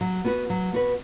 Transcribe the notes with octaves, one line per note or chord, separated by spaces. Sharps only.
F#3
B3 F#4 B4
F#3
B3 F#4 B4